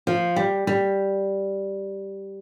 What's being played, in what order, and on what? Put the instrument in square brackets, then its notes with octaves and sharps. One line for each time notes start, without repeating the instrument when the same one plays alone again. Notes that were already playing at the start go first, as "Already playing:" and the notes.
[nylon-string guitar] F3
G3
G3